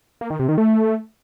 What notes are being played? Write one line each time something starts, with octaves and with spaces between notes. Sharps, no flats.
A#3
D#3
C3
D#3
A3